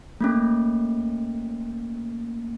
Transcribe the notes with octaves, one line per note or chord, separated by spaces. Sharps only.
A3 A#3 C#4